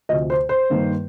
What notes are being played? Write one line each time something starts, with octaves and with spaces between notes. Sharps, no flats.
D2 C3 F3 D#5
C5
C5
G2 D#3 A#3